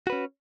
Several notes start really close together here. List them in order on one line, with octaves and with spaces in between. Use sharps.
F#4 B4 C#4